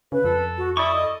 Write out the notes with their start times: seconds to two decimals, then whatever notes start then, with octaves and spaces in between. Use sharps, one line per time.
0.12 C#3 B4
0.25 F2 A4
0.58 F#4
0.77 E4 A4 D5 C#6 D#6
0.93 D#5